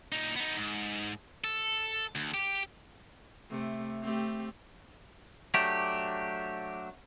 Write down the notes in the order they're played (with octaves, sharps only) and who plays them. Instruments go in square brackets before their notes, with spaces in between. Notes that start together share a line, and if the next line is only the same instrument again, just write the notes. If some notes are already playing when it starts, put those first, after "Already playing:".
[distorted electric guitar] A#2 D#4
B3 D#4
G#2
A4
D2
G4
[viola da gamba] C3 A3
A3 C4 G4
[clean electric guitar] F#3 A3 D4 G4